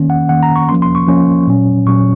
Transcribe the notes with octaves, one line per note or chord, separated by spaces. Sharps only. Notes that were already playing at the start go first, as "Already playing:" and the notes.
Already playing: D#3 A#3 C#4
F#5
D#3 A#3 C#4 F#5
A#5
C#6
F3 A#3 C#4 C6
C6
C#6
F3 A#3 C#4
A#2 F#3 C#4
A#2 F#3 C#4 C#6